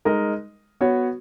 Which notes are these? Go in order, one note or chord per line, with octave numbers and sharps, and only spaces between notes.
G#3 D#4 A#4 D#5
B3 F#4 C#5